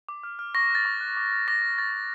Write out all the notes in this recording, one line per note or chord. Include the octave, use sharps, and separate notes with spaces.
D6
F6
F6
C#6 A#6
F#6
A6
C#6
F#6
D6
F6
D6 A#6
D6
C#6 A6
C#6